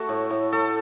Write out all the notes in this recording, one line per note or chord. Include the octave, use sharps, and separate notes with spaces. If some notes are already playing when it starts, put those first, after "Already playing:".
Already playing: A3 F#4 A4
A2
A2
A3 A4